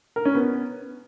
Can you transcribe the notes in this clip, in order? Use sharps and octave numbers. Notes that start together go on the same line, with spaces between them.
A#4
C#4
B3